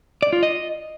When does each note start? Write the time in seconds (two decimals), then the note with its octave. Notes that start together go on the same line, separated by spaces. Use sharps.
0.22 D5
0.33 F4
0.43 D#5